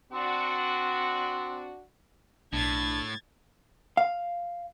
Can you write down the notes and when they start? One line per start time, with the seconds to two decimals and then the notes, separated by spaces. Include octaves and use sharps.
0.12 C4 D4 F#4
2.53 B1 A2 D4 G#6 A6
3.97 F5